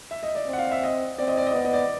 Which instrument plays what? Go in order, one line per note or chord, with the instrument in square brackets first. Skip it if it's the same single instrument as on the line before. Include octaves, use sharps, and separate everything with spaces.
[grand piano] E5
D#5
D5
[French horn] C4
[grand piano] F#5
F5
E5
D#5
[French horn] C4 [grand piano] D5
[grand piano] D#5
D5
D#5
[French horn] B3 [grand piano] D5
[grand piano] D#5
D5